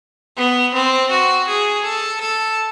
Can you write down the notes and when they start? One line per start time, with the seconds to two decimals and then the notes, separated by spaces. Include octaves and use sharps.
0.38 B3
0.75 C4
1.11 F#4
1.48 G#4
1.85 A4
2.21 A4